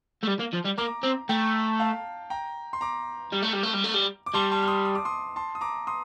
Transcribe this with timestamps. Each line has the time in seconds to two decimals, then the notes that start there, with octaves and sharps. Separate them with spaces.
0.23 A3
0.27 G3
0.39 A#3
0.53 F3
0.65 G3
0.78 A#3 A#5 D6
1.03 C4
1.29 A3 G5 A#5
1.80 F5 A5
2.30 G5 A#5
2.73 C6
2.81 A#5 D6
3.33 G3
3.43 A3
3.53 G3
3.63 A3
3.74 G3
3.84 A3
3.94 G3
4.26 D6
4.34 G3 A5 C6
4.51 A5 C6
4.63 F6
4.68 C6 D#6
4.85 D#6
4.95 D6
5.05 C6 D#6
5.36 A5 C6
5.55 D#6
5.61 A#5 D6
5.87 C6 D#6